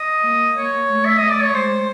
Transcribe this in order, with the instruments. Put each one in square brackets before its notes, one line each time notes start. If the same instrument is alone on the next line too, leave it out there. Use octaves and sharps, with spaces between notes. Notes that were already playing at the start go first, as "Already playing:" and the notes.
Already playing: [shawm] D#5
[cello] A#3
[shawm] C#5
[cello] A3
[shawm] E5
D#5
[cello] A3
[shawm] D5
C#5
[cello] G#3 [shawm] C5